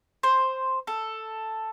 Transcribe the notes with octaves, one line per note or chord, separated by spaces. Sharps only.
C5
A4